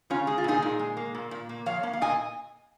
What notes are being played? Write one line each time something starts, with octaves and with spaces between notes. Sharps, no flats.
C#3 C#4 F4
G#3 G#4
F4
A#2 D#4 G#4
A#2
G#3
A#3
A#2
A#2
A#3
F3 C#5 F5
A#3
F5
A#2 D#5 G#5